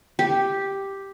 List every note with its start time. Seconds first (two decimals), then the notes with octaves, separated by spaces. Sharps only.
0.19 G4